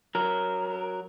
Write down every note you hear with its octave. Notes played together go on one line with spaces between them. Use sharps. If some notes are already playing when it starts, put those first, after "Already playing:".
F#3 A#4